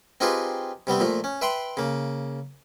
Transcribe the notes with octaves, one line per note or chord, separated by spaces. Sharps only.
C4 D#4 F4 G4 G#4 B4
C3 G3 B3 C4
A#2 F3 A3
C#4
B4 E5 G5 B5 C6
C#3 A#3